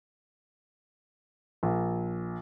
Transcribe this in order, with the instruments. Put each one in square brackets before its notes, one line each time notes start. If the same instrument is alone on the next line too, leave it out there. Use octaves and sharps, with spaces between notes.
[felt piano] A#1